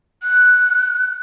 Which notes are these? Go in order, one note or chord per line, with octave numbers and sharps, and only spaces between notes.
F#6